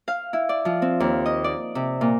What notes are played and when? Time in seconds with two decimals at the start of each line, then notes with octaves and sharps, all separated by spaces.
0.08 F5
0.33 E4
0.49 D5
0.65 F3
0.82 C4
1.00 D#2
1.26 D#5
1.44 D5
1.75 C3
2.01 A#2